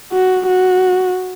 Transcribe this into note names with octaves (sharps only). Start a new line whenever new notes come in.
F#4
F#4